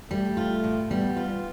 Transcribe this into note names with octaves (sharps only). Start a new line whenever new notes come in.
G3 A3
F4
A2
G3 B3
F4